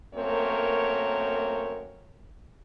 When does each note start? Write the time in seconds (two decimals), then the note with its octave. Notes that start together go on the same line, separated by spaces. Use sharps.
0.15 F#2 A3 A#3 C4 A#4 C#5